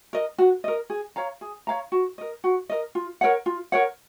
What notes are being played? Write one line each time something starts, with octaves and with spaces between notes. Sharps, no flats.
A#4 D#5
F#4
A#4 D#5
G#4
C#5 F5 A#5
G#4
C#5 F5 A#5
F#4
A#4 D#5
F#4
A#4 D#5
F4
A#4 C#5 F#5
F4
A#4 C#5 F#5